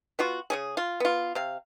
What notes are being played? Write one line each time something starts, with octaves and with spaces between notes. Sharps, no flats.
B3 F4 F#4
C#3 C#4 G#4
F4
B3 F4
C3 F5